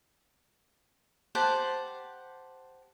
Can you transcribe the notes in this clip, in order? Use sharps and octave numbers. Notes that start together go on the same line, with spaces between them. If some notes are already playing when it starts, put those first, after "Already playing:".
G4 C5 F#5 A5